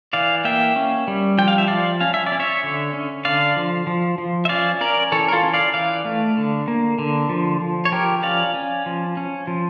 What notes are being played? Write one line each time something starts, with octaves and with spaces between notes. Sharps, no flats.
E3 D5 F5
A#3 E5 G5
C#4
G3
F3 G5
F5
E5
F3 D5 F5
C#4 F5
E5
D5
C#4
C#5 E5
D3
C#4
D3 D5 F5
F3
F3
F3
E5
C#4 D5 F5
C#4 A#4 D5
E3 A4 C#5
A#4
F4 A4
C#4
D5 F5
E3 D5 F5
A3
D3
A#3
D3
F3
F3
C#5
F3 G4 A#4
C#4 D5 F5
C#4
F3
C#4
F3